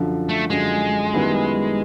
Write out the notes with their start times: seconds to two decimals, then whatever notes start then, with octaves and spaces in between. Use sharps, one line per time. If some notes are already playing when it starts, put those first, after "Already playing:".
Already playing: F#2 D3 F3
0.29 A3
0.50 F#2 D3 F3 G#3
1.13 F#2 D#3 G3 B3 E4